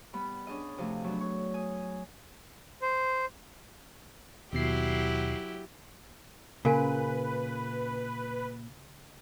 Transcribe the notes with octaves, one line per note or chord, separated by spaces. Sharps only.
G3 B3 B5
C#4 D4 G#4 D#5
C3 F3 A3 G#4
F#3 B3 D4
C#5
G#5 D#6
C5
D#2 B2 F#3 E4 G4 C7
A#2 C#3 A#4 B4 F5 G#5